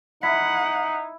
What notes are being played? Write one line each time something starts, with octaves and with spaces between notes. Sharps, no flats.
D#4 E4 F#5 B6